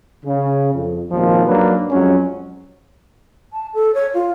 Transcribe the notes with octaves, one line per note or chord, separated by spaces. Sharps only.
C#3
F2
G#1 D#2 A#2 F3
G#2 F#3 A#3 D4 B4
F2 F#3 G#3 C#4
A5
A4
C#5
F4